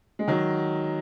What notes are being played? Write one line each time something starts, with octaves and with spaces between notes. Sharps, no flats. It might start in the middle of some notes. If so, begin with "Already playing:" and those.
G#3
D#3 F#3